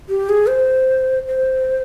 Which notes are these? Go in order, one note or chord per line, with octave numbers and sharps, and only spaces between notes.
G4
G#4
C5
C5